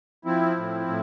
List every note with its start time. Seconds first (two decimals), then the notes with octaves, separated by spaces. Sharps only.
0.25 F3 C4 E4
0.57 A2
0.88 A2